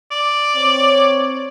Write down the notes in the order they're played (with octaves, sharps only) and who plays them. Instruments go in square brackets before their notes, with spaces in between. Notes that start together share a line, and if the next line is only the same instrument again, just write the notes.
[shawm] D5
[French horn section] C4 C#5